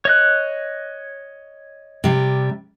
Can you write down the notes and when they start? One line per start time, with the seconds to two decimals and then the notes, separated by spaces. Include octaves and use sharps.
0.05 C#5 D#5 F#6
2.04 C3 G3